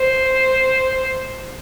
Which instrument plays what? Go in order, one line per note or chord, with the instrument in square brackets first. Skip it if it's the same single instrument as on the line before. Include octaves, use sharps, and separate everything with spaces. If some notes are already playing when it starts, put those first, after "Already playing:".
Already playing: [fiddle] C5